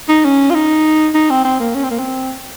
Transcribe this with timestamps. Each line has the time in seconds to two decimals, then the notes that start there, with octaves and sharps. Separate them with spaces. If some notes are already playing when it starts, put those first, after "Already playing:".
0.09 D#4
0.24 C#4
0.50 F4
0.54 D#4
1.15 D#4
1.30 C4
1.45 C4
1.60 A#3
1.75 C#4
1.83 C4
1.91 A#3
1.99 C4